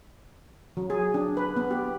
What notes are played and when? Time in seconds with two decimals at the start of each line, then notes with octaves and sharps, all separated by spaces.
0.77 F#3
0.90 G#4
1.14 D4
1.37 B4
1.56 B3
1.71 G4